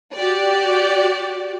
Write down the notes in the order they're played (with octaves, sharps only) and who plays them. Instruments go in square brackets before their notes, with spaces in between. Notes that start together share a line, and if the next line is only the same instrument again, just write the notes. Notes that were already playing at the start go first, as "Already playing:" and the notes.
[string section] F#4 G4 D5